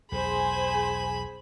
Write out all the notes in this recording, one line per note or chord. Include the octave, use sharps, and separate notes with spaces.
B1 E2 G#4 C5 G#5 B5